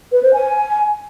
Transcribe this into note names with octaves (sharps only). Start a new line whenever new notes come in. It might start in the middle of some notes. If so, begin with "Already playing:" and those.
B4
C5
G#5